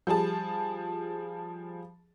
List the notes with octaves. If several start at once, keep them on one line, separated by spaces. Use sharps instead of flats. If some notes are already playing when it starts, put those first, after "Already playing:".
F3 G3 G#4 A5